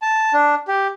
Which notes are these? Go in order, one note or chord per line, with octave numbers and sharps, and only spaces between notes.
A5
D4
G4